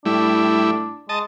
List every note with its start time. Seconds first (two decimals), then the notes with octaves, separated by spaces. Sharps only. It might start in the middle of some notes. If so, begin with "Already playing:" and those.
0.06 A2 G3 D4 E4
1.09 G#3 D#5 A5